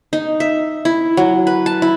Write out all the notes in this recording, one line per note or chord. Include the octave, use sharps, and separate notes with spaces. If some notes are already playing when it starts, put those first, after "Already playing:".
D#4
E5
E4
F#3
B4
A5
E4